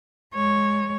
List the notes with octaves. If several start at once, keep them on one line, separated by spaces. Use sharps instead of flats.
G#3 C#5